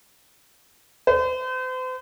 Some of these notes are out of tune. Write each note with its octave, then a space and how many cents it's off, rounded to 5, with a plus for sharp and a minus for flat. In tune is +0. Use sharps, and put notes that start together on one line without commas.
C5 -40